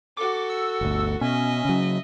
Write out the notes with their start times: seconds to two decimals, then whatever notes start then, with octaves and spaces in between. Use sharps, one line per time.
0.17 F#4 A4 D6
0.50 E6
0.81 G1 D2
1.21 B2 C#4 D#5 E5
1.65 C#3 F#3